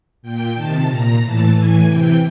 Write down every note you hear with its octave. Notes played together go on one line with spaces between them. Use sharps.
A#2 G5
C3 D#3 A5
A#2 A#5
A2 E3 A5
A2 E3 G#5
C3 E3 G5